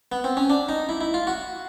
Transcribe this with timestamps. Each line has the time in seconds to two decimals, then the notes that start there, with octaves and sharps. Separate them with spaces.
0.12 B3
0.24 C4
0.37 C#4
0.50 D4
0.69 D#4
0.89 E4
1.01 E4
1.14 F4
1.27 F#4